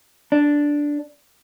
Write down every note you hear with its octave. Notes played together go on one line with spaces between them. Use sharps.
D4